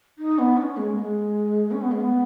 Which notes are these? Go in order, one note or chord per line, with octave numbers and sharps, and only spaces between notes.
D#4
B3
D#4
C#4
G#3
B3
G#3
C#4
B3
G#3
B3